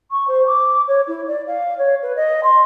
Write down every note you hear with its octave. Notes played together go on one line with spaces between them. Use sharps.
C#6
C5
D6
C#5
E4
D5
F5
C#5
B4
D#5
C6